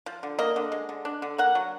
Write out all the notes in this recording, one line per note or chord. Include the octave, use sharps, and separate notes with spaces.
F3
D3
A#3 D#5
D3
G#3
D3
D4
D3
A#3 F#5
F#3